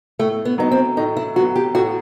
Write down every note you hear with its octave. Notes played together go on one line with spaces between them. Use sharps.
A2 A3
B3
F#3 B3 D#4
C4
A2 D#4
E4
F#3 B3 F#4
G4
A2 F#4